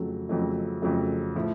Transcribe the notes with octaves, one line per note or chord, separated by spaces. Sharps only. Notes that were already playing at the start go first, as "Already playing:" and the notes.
Already playing: F2 C#3 F#3 A3
F2 C#3 F#3 A3
F2 C#3 F#3 A3
A2 F3